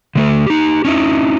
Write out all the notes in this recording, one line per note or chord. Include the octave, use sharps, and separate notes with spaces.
D3 A3 A4
D#4 G4
C#4 D#4 E4